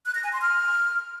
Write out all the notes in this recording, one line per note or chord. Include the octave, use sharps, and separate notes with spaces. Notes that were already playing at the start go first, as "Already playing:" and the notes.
F#6
A#6
G#5
C6
F6